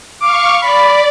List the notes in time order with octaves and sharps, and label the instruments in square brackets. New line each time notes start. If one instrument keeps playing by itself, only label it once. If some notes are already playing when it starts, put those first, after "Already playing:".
[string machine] F5 C#6 [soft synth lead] D6
[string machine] D5 [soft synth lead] B5